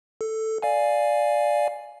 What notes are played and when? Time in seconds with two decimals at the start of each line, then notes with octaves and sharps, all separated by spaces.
0.21 A4
0.62 D5 F5 G#5